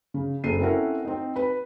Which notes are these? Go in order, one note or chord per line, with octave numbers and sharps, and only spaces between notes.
C#3
F#1 A4 C7 D#7
C4 C#4 E4 A4 A#4 F#5
C4 D#4
B4 B5